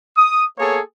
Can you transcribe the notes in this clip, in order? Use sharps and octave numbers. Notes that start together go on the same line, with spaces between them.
D#6
A#3 B3 G#4 A4 C#5